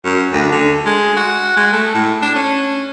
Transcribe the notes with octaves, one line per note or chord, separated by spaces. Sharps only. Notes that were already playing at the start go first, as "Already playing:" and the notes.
F#2
D2
D3
G#3
F#4
G#3
A3
A2
D4
C#4